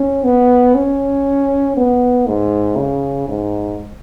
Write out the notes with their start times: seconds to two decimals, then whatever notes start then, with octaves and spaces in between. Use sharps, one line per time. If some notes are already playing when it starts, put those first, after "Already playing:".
Already playing: C#4
0.24 B3
0.75 C#4
1.77 B3
2.27 G#2
2.77 C#3
3.28 G#2